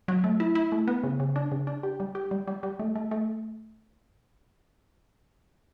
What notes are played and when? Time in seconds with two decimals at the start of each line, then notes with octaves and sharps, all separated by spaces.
0.08 F#3
0.24 A3
0.40 E4
0.55 E4
0.72 A3
0.88 B3
1.03 C#3
1.20 C#3
1.36 D4
1.52 C#3
1.67 D4
1.83 G4
2.00 G3
2.15 G4
2.31 G3
2.47 G3
2.63 G3
2.79 A3
2.96 A3
3.11 A3